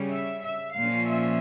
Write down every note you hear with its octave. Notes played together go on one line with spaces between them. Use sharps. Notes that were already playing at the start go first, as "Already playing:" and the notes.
Already playing: C#3 G3 C#4
E5
E5
A#2 F3 C#4 F5
E5